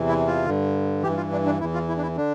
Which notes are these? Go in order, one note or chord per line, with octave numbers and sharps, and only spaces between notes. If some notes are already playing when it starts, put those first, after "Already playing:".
Already playing: E2 C3 E3
E4
F4
G2 D3
G2 E3 G4
F4
D4
D4
E2 E3 E4
F4
E4
D4
E4
D3 D4